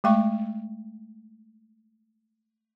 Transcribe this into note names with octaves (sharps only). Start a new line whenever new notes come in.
G#3 A3 G5 C#6